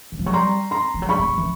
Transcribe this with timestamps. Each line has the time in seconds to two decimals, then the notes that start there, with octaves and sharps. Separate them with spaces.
0.12 E3
0.19 F3
0.26 F#3 C#6
0.33 G3 A#5 C6
0.71 A#5 C6
0.94 F3
1.02 F#3
1.09 G3 B5 C#6
1.19 G#3
1.28 G3
1.38 E3